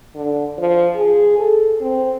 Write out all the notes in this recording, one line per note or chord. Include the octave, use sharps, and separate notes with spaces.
D3
F3
G#4
A4
C4